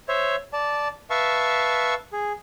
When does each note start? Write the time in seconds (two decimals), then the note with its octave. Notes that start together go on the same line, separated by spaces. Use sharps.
0.08 C5 C#5 E5
0.53 D5 A5
1.10 B4 E5 F5 A5 C#6
2.13 G#4